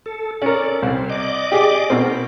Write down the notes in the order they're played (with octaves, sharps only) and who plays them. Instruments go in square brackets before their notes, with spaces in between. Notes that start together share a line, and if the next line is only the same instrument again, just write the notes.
[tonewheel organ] A4
[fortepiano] C#4 A#4 [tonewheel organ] A4 D5
[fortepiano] C2 [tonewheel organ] C5
[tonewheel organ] D5 D#5 D6
[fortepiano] G4 G#4
[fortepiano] B2 C4 [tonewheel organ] A#4